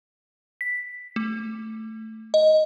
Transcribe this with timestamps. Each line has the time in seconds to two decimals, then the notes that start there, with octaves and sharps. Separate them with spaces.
0.61 B6
1.16 A3
2.34 D#5